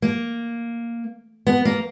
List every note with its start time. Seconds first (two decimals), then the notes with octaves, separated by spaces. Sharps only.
0.02 A#3
1.47 B3
1.65 A#3